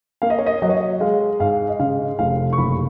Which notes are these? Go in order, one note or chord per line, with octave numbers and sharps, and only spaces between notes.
A#3 F5
D#5
C#5
D#5
F#3 D#5
C#5
D#5
G#3 F5
G#2 F5
D#5
C#3 F5
F1 F5
C#6
F#1 B5